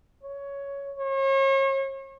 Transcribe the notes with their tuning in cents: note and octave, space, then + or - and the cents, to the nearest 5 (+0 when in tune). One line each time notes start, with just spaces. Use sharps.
C#5 +10
C#5 -40